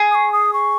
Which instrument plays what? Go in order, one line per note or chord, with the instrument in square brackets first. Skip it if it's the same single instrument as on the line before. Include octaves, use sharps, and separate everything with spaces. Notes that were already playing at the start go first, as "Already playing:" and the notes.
Already playing: [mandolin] G#4
[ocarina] D#6
C#6
D#6
C#6